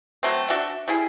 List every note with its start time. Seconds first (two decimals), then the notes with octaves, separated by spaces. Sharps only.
0.23 F#3 A3 C4
0.50 D4 F#4 D5 E5
0.88 G3 E4 G#4